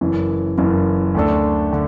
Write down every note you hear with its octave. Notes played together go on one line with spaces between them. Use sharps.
F#1 F#2 E3
F#1 F#2 E3
D2 D3 A3 D4 A4
D3